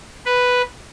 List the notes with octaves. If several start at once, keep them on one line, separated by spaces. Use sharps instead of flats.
B4